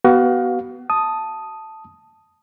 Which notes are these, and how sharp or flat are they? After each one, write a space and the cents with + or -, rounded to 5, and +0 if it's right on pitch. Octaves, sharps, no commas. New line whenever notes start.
B3 +0 F#4 +35 F5 +25
A5 +0 D#6 +0